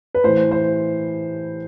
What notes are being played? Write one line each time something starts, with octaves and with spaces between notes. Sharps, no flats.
B4
A2 E3 C5
C5